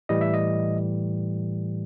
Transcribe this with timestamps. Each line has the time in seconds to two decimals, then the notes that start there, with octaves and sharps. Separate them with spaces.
0.09 A2 E3 G3 D#5
0.21 E5
0.34 D#5